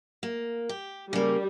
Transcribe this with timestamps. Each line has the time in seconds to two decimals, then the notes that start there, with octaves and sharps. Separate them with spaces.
0.23 A#3
0.69 G4
1.13 C#3 G3 A#3